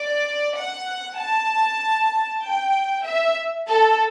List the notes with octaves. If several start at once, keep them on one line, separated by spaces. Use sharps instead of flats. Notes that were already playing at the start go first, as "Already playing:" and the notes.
Already playing: D5
F#5
A5
G5
E5
A4